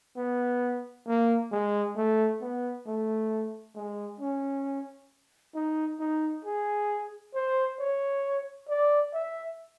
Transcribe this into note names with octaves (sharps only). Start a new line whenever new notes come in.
B3
A#3
G#3
A3
B3
A3
G#3
C#4
D#4
D#4
G#4
C5
C#5
D5
E5